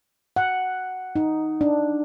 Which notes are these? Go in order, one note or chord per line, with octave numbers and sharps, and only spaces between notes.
F#5
D#4
D4